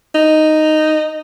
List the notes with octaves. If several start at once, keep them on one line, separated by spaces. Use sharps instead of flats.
D#4